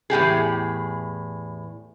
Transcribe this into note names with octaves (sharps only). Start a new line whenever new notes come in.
E2 A2 G4 G#4